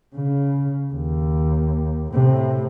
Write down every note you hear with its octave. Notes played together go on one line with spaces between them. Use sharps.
C#3
D#2
A2 C3